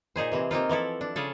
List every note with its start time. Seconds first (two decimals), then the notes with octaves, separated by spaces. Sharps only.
0.16 A#2 D#4 G#4 C5
0.32 C3 E3 C4
0.51 A#3 C4 D#4 F4
0.69 E3 F3 E4 A4
1.01 D4
1.16 C#3 F4 G#4 A4